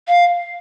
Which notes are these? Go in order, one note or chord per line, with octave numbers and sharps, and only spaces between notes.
F5